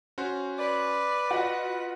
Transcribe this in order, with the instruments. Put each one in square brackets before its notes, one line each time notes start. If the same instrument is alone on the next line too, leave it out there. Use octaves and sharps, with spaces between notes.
[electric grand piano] C#4 F#4 C5
[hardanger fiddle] B4 [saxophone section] D5
[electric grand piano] F4 [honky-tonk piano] F#4 D#5